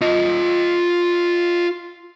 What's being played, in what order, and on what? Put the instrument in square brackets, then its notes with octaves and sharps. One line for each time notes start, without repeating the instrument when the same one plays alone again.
[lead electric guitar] F4 D#5